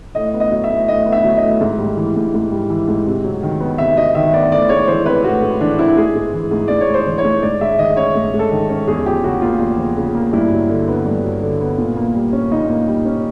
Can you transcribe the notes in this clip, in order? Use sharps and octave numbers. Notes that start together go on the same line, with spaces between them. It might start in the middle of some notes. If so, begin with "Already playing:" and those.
A2 D#5
B3
D#5
F#3
E5
A2
A2 D#5
B3
E5
F#3
D#5
A2
G#2
G3
E3
G#2
G#2
G3
E3
G#2
C3
F#3
D#3
B3
C3 E5
F#3 D#5
D#3 E5
B3 D5
A2 D5
G#3 C#5
E3 C5
C4 B4
A2 F#4
G#3
E3 D4
C4 E4
G#2 G#4
G#3
E3
G#2
G#2 D5
C#5
G#3
C5
E3
C#5
G#2
G#2 D5
G#3 E5
D#3 D#5
C#4 C#5
G#2
G#3
A4
D#3
C#4
E2 G#4
F3 G4
C#3 F#4
A#3 F4
E2
F3
C#3
A#3
G2 E4
F#3
D3
B3
G2
F#3
D3
B3
A#2
A#3
G3
C#4
A#2 D#4
A#3
G3
C#4